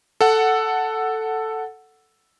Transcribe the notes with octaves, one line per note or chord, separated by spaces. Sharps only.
A4 F#5